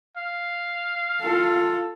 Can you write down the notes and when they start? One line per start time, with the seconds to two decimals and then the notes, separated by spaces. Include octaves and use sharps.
0.17 F5
1.21 F4 A4